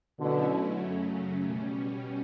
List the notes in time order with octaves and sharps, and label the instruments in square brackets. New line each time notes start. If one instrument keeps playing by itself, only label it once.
[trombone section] B2 D3 [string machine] F#3 A3 C#4 E4
[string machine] F#2 C#3 F#3 A3 C#4
B2 G3 C#4